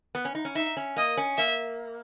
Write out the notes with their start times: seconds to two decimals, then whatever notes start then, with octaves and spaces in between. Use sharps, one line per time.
0.15 B3
0.25 C#4
0.35 D#4
0.45 C#4
0.55 D#4 E5
0.77 C#4
0.96 A#3 D#5
1.17 C#4
1.37 A#3 E5